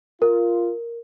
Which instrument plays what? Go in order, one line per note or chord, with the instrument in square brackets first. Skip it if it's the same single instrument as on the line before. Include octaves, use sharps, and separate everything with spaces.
[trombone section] F4 [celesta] A#4